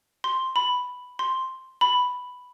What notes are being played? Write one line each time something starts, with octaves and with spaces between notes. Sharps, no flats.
C6
B5
C6
B5